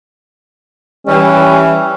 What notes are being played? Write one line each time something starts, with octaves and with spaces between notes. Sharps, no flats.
E3 G3 C#4